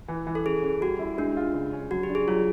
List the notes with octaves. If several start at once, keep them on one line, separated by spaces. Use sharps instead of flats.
E3
E3
A4
C#4 G#4
C#4
G3 F#4
E4
G#3 D4
F4
C#3
C#4
F#3 F#4
G4
D4
G#4
F#3 F4